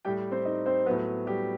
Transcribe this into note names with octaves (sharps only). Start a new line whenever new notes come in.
A2 G3 G4 G5
C4 C5
D#4 D#5
C4 C5
F#3 B3 B4
A2
G3 G4